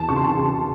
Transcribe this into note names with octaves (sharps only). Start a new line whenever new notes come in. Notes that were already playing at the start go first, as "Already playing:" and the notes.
Already playing: E2 A5
C#3 C#6
C6
A5
C#3